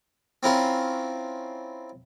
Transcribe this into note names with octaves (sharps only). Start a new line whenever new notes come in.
C4 C#4 E4 F4 A#4